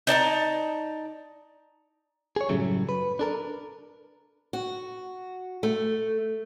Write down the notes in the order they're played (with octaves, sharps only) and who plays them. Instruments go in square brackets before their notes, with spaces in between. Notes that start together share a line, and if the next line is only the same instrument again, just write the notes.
[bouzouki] D#4 D5 A5 A#5
[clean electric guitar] G#4 C#5
F#2 A2 C#3 F#3 G3 A3
B4
D4 A4 A#4
[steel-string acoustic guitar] F#4
A3